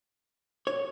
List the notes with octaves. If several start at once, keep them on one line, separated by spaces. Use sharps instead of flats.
C#5